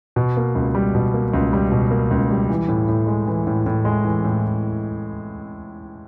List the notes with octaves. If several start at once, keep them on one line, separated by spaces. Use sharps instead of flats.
B2
A#3
C#2
G3
B2
A#3
C#2
G3
B2
A#3
C#2
G3
E3
A2
A2
G#3
E3
A2
A2
G#3
E3
A2